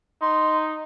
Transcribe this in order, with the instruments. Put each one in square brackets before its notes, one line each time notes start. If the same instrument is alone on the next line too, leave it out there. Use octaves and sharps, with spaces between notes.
[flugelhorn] D#4 [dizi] C6